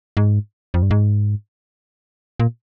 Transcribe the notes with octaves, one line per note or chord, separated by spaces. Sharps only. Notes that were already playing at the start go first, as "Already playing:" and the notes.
G#2
F2
G2
G#2
A#2